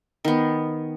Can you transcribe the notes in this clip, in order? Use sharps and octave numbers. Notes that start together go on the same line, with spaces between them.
D#3 B3